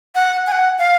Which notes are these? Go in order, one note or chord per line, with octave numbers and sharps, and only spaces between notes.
F#5
G#5
F#5
F5